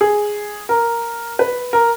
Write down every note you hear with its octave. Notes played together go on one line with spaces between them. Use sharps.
G#4
A#4
B4
A#4